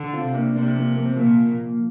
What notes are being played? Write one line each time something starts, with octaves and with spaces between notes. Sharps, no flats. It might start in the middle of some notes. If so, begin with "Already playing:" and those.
Already playing: D3
C4 F4
C3
A#3 D4
C3 A#3 D4
F3 A#3
A#3
C4
A#2 F3 A#3